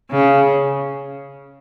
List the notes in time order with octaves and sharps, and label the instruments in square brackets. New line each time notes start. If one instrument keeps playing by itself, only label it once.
[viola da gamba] C#3